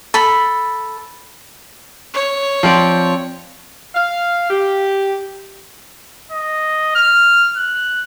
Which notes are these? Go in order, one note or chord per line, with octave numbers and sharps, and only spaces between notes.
A4 B5
C#5
F3 C4 D5
F5
G4
D#5
F6
F#6